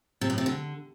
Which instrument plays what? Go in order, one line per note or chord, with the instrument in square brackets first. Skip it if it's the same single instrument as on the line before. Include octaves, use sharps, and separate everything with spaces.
[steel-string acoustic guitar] C3
A2
C3
D3